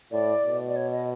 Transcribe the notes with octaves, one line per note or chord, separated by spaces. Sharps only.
A2 D5
B2
D5
C#5
D#5